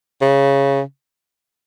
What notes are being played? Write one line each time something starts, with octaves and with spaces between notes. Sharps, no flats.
C#3